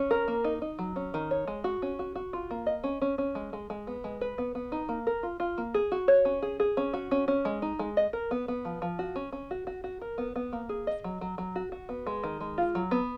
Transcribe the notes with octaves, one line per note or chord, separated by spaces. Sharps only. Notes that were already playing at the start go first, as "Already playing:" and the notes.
Already playing: C#4
A#4
A#3
D#4
D#4
F#3
C#4
D#3
C#5
G#3
F#4
C#4
F#4
F#4
F4
A#3
D#5
C#4
C#4
C#4
G#3
G#3
G#3
B3
G#3
B4
B3
B3
D#4
A#3
A#4
F4
F4
A#3
G#4
F#4
C#5
C#4
G#4
G#4
C#4
F#4
C#4
C#4
G#3
D#4
G#3
D#5
A#4
B3
B3
F3
F3
F#4
C#4
C#4
F#4
F#4
F#4
A#4
B3
B3
A#3
G#4
D#5
F#3
F#3
F#3
F#4
F#4
B3
G#3
D#3
G#3
F4
F#3
B3